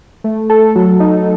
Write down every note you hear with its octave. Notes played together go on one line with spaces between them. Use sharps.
A3
A4
F#3
D#4